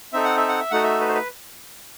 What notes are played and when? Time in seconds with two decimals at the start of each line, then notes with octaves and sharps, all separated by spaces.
0.13 C4 D#4 A4 E5
0.24 F#5
0.37 E5
0.48 F#5
0.60 E5
0.71 A3 D#4 F#4 A4 F#5
0.83 E5
1.01 B4
1.08 C5
1.15 B4